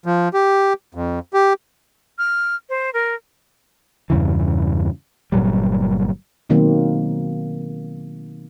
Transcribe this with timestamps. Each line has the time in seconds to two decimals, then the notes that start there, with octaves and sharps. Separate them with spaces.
0.06 F3
0.34 G4
0.95 F2
1.34 G4
2.18 F6
2.69 C5
2.93 A#4
4.10 E2 G2 C#3 E3
5.32 G1 A#2 F#3 G3
6.50 B2 D#3 F#3 A#3 C4